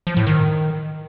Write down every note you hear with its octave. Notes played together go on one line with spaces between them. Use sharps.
F3
A2
D#3